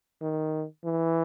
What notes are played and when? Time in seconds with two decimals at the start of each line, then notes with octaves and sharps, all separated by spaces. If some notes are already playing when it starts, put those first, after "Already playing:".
0.22 D#3
0.85 E3